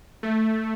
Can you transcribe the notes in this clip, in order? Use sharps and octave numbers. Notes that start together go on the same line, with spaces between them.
A3